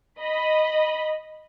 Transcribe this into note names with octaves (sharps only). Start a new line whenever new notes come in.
D#5 B5